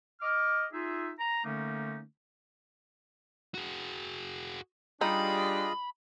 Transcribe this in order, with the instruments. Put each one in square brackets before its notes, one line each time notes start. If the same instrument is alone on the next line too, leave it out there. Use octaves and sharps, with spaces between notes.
[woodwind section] D#5 D6 F6
D#4 F4 G#4 E5
A#5
D3 A3 A#3 C#4 D#4
[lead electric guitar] F#4 G#4
[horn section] G3 D4 [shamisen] D#4 [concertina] F4 G#4 D#5 [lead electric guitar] B5